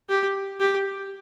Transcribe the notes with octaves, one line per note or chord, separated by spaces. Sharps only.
G4
G4